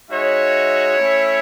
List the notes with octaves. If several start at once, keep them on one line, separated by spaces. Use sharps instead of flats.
G#3 D#4 F#4 C#5 E5
A3 C#4 E4